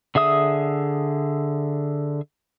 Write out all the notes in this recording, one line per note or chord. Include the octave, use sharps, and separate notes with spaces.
D3 G#4 E5 D#6